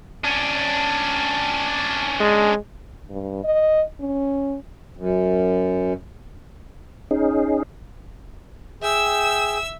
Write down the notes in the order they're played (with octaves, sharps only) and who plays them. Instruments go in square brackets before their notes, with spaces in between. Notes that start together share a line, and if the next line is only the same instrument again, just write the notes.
[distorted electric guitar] C#4 D4
[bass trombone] G#3
[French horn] G2
D#5
C#4
[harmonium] F#2
[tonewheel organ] C#4 D#4 G#4
[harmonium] G#4 G5 [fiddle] E5 E6